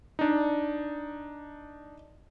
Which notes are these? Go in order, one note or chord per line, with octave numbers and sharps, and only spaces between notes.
D4 D#4